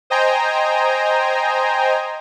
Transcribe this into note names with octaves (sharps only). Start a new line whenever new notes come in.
C5 D#5 G5 G#5 A#5